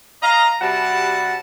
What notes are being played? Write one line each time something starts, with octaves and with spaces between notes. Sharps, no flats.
D#5 F5 A#5
C3 G3 F#4 F#5 A5 B5